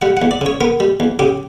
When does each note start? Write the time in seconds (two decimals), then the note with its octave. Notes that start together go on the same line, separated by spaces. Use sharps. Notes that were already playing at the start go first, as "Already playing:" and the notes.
0.02 G3 F#5
0.17 F#5
0.22 E2
0.31 D5
0.41 C#3 C#5
0.61 B3 A#4
0.80 G3
1.00 E2
1.19 C#3 G4